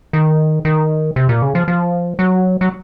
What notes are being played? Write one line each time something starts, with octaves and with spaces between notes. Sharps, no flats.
D#3
D#3
C3
A#2
C#3
F3
F3
F#3
F#3